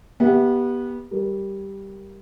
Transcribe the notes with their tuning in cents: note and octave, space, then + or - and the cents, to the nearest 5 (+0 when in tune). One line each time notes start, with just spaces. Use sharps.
B3 -20 G4 +0 E5 +0
G3 +0 A#4 +0